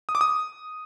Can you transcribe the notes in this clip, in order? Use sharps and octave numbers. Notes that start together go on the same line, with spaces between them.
D#6
D6
D#6